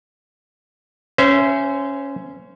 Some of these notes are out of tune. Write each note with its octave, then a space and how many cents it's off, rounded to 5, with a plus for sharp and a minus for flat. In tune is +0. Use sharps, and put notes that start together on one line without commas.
C#4 +0 C5 -20 E5 +20